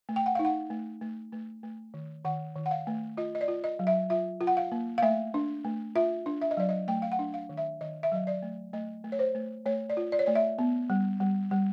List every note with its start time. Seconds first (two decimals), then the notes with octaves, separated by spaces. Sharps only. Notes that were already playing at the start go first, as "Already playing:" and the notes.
0.09 A3
0.16 G5
0.26 F#5
0.35 D#4 F5
0.45 F#5
0.70 A3
1.01 A3
1.32 A3
1.63 A3
1.94 D#3
2.25 D#3 F#5
2.56 D#3
2.66 F#5
2.71 F5
2.87 A3
3.17 F4 D#5
3.35 D#5
3.41 D5
3.48 F4
3.64 D#5
3.79 F#3
3.87 E5
4.10 F4 E5
4.41 F4
4.47 F#5
4.57 F5
4.72 A#3
4.98 F5
5.02 A3 E5
5.34 D4
5.65 A3
5.96 F4 E5
6.26 D4
6.41 E5
6.51 D#5
6.57 F#3 D5
6.69 D#5
6.88 A3 G5
7.02 F5
7.12 F#5
7.19 D4
7.34 F5
7.49 D#3
7.57 E5
7.81 D#3 D#5
8.03 E5
8.12 F#3 D#5
8.27 D5
8.42 A3
8.73 A3 D#5
9.04 A3
9.12 C#5
9.19 C5
9.35 A3
9.66 A3 C#5
9.90 D5
9.97 F4
10.12 D5
10.19 C#5
10.26 A3 D5
10.35 E5
10.59 B3
10.90 G3
11.20 G3
11.51 G3